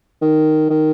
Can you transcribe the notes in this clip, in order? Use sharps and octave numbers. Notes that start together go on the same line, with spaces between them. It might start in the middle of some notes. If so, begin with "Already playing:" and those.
D#3
D#3